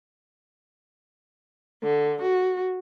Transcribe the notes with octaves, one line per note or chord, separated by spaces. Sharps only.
D3
F#4